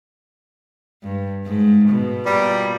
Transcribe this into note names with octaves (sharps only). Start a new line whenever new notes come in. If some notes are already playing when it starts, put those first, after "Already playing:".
G2
G#2
B2
A#2 G3